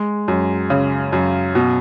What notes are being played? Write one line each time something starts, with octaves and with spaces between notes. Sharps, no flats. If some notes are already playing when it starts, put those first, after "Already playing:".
Already playing: G#3
F#2
C#3
F#2
B2